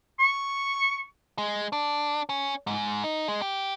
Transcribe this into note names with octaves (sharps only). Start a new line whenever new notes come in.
C#6
G#3
D4
C#4
G#2
D#4
G#3
G4